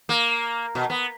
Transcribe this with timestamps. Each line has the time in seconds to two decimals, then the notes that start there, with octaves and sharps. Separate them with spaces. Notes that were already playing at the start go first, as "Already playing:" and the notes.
0.09 A#3
0.75 B2
0.90 B3